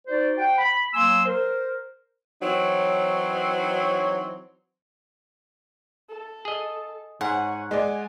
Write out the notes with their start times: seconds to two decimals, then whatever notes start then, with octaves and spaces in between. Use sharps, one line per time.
0.07 D#4 F#4 C5 D5
0.38 C5 F#5 G5
0.58 B5
0.94 F#3 A#3 G#5 C6 E6
1.26 A#4 C5
2.42 E3 F#3 C4 D#4 C#5
6.09 A4
6.45 G#4 D#5
7.21 G#2 C#5 F#5 G#5
7.71 G#3 D5 G#5